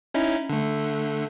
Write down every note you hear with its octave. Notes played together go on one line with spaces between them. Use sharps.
C#4 D#4 E4
D3 A3